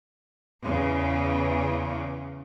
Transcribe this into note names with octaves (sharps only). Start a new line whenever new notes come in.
E2 C#3